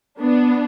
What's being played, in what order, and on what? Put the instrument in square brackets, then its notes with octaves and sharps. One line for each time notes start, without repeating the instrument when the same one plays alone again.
[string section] B3 D4